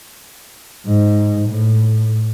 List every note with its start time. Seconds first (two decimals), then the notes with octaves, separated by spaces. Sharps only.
0.87 G#2
1.49 A2